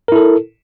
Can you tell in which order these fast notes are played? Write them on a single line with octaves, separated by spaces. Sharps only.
A#4 E4 A4